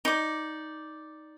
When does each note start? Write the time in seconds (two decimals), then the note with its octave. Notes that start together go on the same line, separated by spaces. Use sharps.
0.05 D#4 D5